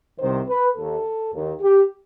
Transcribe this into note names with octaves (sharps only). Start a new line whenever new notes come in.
C2 C3 D#3 C5
B4
D#2 D#3 A4
D#2 D#3
G4